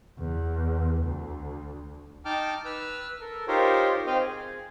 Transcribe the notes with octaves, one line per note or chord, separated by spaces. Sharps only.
E2
D2
D#4 G5 A5 D6 F6
B4 E6 F6
A4 A#4
D#4 F4 G4 A#4 C5 C#5
C4 C5 D#5 F5 G5
G#4